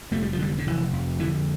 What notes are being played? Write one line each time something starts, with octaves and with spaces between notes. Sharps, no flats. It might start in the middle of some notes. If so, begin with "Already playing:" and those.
F1 A3
G3
F3
D3 G3
D3
F1 E3
F2
D3 E3